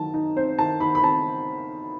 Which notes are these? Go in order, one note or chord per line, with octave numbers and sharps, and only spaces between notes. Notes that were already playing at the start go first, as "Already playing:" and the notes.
Already playing: D#3 F#3 A5
D#4
C4 C5
D#3 A5
D#3 B5
B5
C4 A5